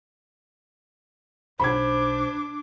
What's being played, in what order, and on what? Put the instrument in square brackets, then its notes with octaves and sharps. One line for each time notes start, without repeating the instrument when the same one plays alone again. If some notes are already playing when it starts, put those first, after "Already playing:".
[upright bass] B1 [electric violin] D4 D6 [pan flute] C5 [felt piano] B5 G#6